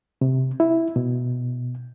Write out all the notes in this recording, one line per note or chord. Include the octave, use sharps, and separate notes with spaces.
C3
E4
B2